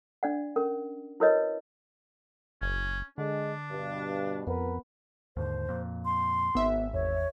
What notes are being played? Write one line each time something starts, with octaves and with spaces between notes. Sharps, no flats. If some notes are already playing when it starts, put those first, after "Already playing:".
D4 D5 F#5
C#4 A#4
E4 F#4 A#4 B4 C#5 D#5
F#1 C#4
D3 G#3 D4
G2 B2
F2 B3 A#4 B4
D#2 G#2 D3 C5
F2 A#2
C6
G#1 B3 E5
E2 C#5